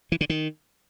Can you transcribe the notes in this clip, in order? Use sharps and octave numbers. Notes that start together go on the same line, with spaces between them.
E3
D3
D#3